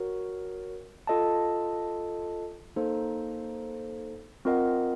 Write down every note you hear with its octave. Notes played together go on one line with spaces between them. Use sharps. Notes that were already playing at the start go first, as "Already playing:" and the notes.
Already playing: F#4 A#4 C#5
F4 A4 D#5 A5
A#3 D#4 A4 C5
C4 F4 A#4 D#5 F#5